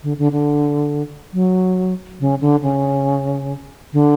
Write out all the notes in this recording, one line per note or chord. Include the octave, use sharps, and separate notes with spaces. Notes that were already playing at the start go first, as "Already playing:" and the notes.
D3
D3
D3
F#3
C#3
D3
C#3
D3